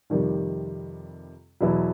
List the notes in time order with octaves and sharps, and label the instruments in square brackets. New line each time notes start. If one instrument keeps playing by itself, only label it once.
[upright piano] F2 C3 D#3 G3
E2 B2 F#3 B3 E4